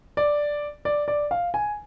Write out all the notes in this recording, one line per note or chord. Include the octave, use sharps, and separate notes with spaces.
D5
D5
D5
F5
G#5